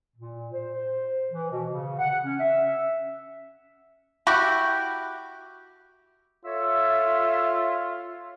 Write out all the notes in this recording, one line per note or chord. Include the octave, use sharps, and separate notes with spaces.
A#2
C5
E3
B2
C#3
F#5
C#4
E5
E4 F#4 G4
F4 A4 C#5 E5